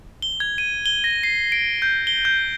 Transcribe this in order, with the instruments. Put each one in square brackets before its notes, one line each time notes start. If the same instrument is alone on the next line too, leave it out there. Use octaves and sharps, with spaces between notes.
[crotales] G7
G#6
D#7
G7
A#6
C7
D7
G6
G7
G6